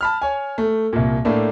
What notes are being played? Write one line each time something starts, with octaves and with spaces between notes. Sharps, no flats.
A5 B5 F6
C#5 G#5
A3
C2 A#2
A2 A3 A#3 D4